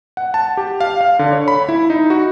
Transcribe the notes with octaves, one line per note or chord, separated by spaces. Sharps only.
F#5
A5
G4
F5
F5
D3
C#5
B5
E4
D#4
F#4